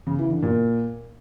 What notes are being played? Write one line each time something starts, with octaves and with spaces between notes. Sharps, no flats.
C#3
E3
D3
A#2